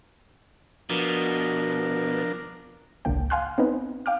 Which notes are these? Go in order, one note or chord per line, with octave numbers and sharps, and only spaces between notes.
B2 F3 D4 A#4
G#1 C#2 D3 A#3 G5
F5 G5 G#5 C6 F6 F#6
B3 C4 D#4 B4
F5 G5 D6 F6